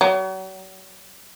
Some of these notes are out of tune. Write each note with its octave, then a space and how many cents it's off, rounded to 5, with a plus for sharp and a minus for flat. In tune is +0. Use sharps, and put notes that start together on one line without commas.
F#3 +40